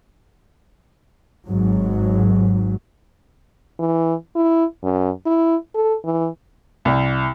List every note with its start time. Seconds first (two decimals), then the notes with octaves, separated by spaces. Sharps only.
1.48 G#1 G#2 F#3
3.79 E3
4.35 E4
4.83 F#2
5.26 E4
5.74 A4
6.05 E3
6.85 C2